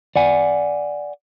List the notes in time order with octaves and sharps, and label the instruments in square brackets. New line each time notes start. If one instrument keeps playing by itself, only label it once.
[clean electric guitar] D5 F#5 G#5